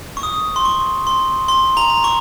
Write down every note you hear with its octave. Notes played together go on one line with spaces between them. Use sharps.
C#6
D#6
C6
C#6
C6
C6
A#5
C#6